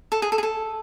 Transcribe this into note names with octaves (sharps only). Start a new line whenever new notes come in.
A4
G#4
A4
G#4
A4